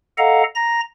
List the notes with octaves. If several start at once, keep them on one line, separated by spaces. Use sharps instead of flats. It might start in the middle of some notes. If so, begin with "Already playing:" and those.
A4 D#5 F5 F#5 A#5
A#5 A#6